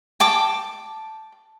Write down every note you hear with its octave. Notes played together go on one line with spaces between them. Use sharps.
G5 A5 D6